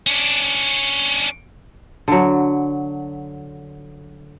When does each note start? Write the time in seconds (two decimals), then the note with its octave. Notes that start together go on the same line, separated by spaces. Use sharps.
0.07 C#4 D4
2.08 D3 F#3